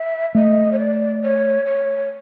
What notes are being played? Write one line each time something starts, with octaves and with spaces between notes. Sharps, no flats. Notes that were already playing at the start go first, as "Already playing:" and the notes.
Already playing: E5
A3 D#5
C#5
D5
C#5
C#5